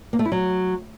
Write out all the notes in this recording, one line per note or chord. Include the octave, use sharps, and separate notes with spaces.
A#3
A3
E4
F#3